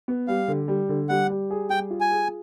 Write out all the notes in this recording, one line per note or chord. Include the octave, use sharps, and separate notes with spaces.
B3
G3 F5
D3
G3
D3
G3 F#5
G3
G#4
G3 G5
F4
G#5
G#4